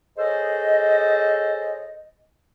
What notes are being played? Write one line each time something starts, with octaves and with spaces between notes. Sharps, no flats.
G#4 A4 C5 C#5 D#5